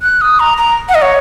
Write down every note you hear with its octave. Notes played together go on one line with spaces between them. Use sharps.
F#6
D#6
A#5
A#5
F#5
D#5
C#5